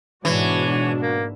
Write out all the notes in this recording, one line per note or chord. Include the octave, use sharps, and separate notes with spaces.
G#2 B2 E3 D4 F#4 C#5
A#3